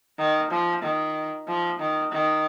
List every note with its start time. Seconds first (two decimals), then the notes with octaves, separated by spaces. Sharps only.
0.18 D#3
0.51 F3
0.82 D#3
1.47 F3
1.79 D#3
2.12 D#3